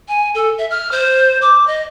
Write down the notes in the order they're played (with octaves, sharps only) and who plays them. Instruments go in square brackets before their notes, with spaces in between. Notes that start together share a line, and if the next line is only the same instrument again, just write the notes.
[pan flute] G#5
A4
E5
F6
C5
D6
D#5